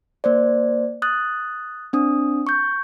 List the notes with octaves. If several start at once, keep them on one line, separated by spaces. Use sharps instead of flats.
A#3 C5 D5
D#6 F#6 A6
C4 D4 D#6
C#6 G6